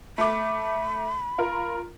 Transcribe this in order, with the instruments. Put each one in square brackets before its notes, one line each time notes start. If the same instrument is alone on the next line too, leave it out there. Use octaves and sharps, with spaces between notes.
[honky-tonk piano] A3 D6 [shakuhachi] B5
[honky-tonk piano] F4 A#4